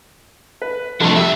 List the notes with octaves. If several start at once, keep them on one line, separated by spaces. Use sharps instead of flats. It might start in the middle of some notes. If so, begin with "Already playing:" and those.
B4
C2 F2 D3 A3 A5
G2 G4 E5